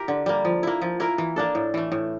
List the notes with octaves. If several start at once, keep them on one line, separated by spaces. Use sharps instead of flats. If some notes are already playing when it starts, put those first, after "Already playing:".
Already playing: E4 G4 A#4
D3
G3 A#3
F3
A#3 E4
F3
A#3 E4 A#4
E3
A#3 D4 A4
A2
E3 A3
A2